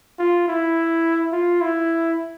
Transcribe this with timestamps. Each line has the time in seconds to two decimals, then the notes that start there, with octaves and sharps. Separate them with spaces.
0.19 F4
0.48 E4
1.32 F4
1.61 E4